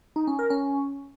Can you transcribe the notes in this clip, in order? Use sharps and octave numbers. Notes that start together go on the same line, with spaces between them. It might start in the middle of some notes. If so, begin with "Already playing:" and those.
D#4
C#4
A#4
C#4